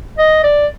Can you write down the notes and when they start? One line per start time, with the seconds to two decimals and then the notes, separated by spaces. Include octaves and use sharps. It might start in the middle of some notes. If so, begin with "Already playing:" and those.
0.18 D#5
0.43 D5